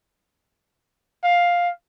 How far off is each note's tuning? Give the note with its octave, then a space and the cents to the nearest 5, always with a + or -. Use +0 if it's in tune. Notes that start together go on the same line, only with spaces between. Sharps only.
F5 +10